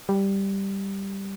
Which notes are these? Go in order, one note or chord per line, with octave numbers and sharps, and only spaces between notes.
G3